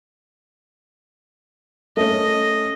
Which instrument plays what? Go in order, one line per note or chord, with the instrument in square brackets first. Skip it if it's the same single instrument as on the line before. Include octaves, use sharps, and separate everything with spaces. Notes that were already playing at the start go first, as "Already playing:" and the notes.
[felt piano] A3 C#4 [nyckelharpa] D#5